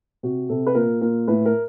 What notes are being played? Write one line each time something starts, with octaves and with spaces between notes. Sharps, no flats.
C3 F#4
C3 A4
B4
A#2 A#4
A#2 A#4
A2 B4
A#4